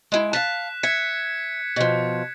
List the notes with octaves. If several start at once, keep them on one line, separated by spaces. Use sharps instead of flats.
G#3 E4
F5 A5 F#6 B6 E7
E5 G#6 B6 C#7
B2 F3